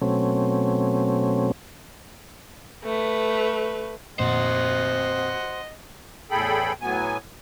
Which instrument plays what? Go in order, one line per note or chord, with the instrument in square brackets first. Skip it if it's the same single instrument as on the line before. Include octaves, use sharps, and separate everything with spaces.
[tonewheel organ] B2 F#3 A3 C4 C#4
[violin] A3 B4
[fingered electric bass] F2 A#2 [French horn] C4 [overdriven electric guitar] F#4 C5 [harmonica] D#5 F#5
[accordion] E2 A2 G#4 A4 G5 B5
A2 F#3 B3 G#5